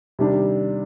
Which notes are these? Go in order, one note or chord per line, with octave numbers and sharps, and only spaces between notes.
C3 D#3 G3 D4 G4